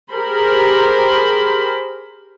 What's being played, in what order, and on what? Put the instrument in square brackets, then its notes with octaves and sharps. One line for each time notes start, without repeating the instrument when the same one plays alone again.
[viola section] G4 G#4 A#4 C5 B5